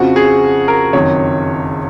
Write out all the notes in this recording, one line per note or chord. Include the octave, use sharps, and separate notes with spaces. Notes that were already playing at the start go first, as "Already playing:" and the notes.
Already playing: F2 C#3 F3 F#4
G#4
A#4
F#1 F2 D#3 F#3 C#5